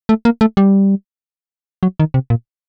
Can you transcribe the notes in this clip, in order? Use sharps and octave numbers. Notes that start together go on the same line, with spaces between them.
A3
A#3
A3
G3
F#3
D#3
C3
A#2